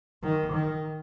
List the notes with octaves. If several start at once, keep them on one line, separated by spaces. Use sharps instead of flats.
D#3
D#3